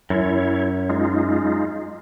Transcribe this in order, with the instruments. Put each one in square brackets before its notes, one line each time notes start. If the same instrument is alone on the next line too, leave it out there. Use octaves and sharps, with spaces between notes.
[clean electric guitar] F#2 [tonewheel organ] E4 C#5
[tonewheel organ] G#3 D#4 F4